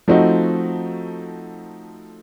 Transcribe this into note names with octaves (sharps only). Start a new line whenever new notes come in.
F3 A3 C4 D#4 F#4